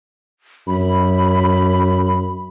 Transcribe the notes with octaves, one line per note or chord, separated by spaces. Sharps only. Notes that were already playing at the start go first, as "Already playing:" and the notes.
F#2 B5